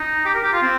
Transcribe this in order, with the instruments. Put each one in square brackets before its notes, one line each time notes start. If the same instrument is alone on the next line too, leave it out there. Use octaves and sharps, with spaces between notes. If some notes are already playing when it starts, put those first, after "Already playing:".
Already playing: [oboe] D#4
G4
A#4
G4
F4
C4